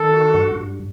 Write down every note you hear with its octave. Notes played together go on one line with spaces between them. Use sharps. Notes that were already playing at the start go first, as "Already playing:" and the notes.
Already playing: D#3 A4
F#4
G2
G2